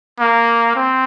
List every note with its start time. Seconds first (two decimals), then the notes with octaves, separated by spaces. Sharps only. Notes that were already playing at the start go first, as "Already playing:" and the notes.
0.20 A#3
0.76 C4